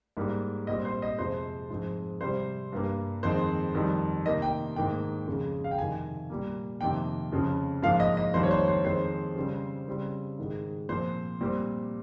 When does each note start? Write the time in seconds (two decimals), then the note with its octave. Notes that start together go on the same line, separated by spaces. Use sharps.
0.17 G#2 G3 A#3
0.67 A#2 G3 C4 D#5
0.85 C5
1.02 D#5
1.18 F2 C3 F3 G#3 C4 C5
1.70 G#2 F3 G#3 C4
2.21 C3 G3 C4 C5
2.72 G2 G3 A#3
3.23 F2 D#3 G#3 C4 C5
3.75 F2 D#3 G3
4.25 C3 D#3 A#3 D#5
4.42 G5
4.76 G#2 D#3 A#3 G5
5.27 F2 C#3 G#3
5.64 F5
5.71 G5
5.78 F2 C3 D#3 G#5
6.30 A#2 G3 A#3
6.81 F2 C3 D#3 A#3 G5
7.32 F2 C#3 F3
7.82 G#2 F3 A#3 F5
8.00 D#5
8.17 D#5
8.34 F2 D#3 G3 A#3 C5
8.43 C#5
8.51 C5
8.68 C5
8.85 F2 D#3 G#3 C4 C5
9.36 C#3 G3 C4
9.88 C#3 G3 C4
10.39 G#2 D#3 G#3
10.89 A#2 F3 C4 C5
11.41 A#2 G3 C4